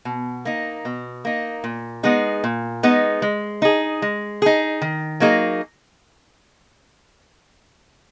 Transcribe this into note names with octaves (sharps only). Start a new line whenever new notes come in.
B2
A#3 D#4
B2
A#3 D#4
A#2
G#3 B3 D#4 G#4
A#2
G#3 B3 D#4 G#4
G#3
D#4 G#4
G#3
D#4 G#4
D#3
F#3 A#3 D#4 G#4